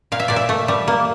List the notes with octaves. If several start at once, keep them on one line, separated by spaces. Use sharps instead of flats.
A#2 F5
E5
A#2 D5
E5
A3
G3
A#3